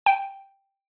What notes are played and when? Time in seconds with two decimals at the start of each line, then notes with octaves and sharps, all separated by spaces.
0.06 G5